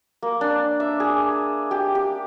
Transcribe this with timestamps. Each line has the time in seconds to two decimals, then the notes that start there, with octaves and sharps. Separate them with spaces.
0.23 A#3
0.41 D4
0.80 E5
1.00 G#4
1.71 G4
1.95 G4